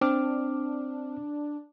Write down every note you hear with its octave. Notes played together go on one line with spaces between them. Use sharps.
C4 D4 D6 F6